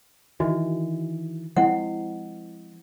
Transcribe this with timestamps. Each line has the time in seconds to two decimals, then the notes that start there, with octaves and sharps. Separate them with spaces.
0.40 D#3 E3 F#4
1.56 F3 G#3 C4 E4 F#5